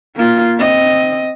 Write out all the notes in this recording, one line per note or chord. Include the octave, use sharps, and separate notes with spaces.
A#3 F4
C4 D#5